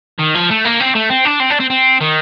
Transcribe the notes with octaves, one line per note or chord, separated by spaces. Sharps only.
D#3
F3
A3
A#3
C4
A3
C4
D4
C4
D4
C4
C4
D#3